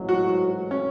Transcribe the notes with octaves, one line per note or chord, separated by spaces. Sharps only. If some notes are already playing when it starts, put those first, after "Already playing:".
Already playing: A1 G#2 F#3
F#4
C#4